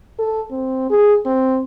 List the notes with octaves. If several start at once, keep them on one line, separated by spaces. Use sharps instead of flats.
A4
C4
G#4
C4